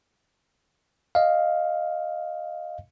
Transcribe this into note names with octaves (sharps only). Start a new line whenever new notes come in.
D#5 F5